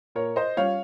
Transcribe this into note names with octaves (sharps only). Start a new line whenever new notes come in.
A#2 A#4 C#5
C5 D#5
G3 C#4 F4 C#5 F5